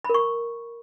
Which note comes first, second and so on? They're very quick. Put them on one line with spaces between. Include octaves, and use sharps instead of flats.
B5 A#4 C#6